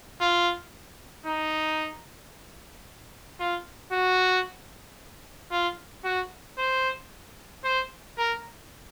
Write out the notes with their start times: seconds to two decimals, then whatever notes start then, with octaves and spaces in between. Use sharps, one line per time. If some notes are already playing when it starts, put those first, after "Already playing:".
0.21 F4
1.26 D#4
3.40 F4
3.92 F#4
5.52 F4
6.04 F#4
6.58 C5
7.64 C5
8.18 A#4